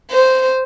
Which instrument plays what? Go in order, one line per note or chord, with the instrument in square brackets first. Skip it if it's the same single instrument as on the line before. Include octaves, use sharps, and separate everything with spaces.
[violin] C5